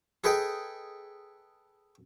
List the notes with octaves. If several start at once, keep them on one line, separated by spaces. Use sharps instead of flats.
G#4 A4 B4 D#5 G5